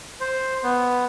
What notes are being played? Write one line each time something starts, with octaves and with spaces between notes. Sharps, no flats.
C5
B3